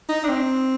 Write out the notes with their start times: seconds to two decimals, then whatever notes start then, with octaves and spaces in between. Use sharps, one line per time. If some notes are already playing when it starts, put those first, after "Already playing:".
0.09 D#4
0.24 D4
0.28 C4